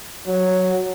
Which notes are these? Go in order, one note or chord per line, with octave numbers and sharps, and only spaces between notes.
F#3